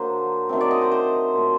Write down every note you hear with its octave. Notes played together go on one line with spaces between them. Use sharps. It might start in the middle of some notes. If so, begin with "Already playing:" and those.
Already playing: D3 F#3 A#3 C5
D#3 F#3 A3 C4
D5
D#5
C5
C5
A#2 F#3 A3